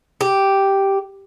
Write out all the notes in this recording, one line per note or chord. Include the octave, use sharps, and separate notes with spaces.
G4